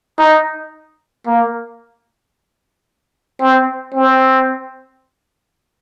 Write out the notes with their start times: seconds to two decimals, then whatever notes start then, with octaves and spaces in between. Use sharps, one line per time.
0.19 D#4
1.26 A#3
3.40 C4
3.94 C4